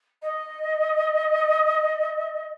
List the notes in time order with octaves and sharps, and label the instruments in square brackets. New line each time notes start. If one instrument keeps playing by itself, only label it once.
[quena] D#5